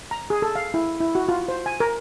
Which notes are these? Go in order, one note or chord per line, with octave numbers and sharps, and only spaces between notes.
A#5
G#4
A4
F5
E4
E4
F#4
F4
C5
G#5
A#4